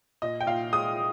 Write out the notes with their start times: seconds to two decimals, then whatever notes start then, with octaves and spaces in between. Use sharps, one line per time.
0.22 A#2 D#5
0.41 G5
0.47 A#2 F5
0.72 G#3 D#6